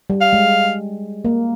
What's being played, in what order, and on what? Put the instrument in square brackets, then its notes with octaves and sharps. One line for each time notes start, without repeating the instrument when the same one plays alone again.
[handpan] G3
[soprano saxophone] F5
[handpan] G#3
A#3